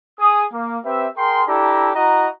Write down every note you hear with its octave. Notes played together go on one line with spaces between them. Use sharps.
G#4 D#6
A#3
C4 G4 B4 E5
G#4 A#4 G5 C6
D4 E4 G4 A4 A#5
E4 F#4 D#5 A#5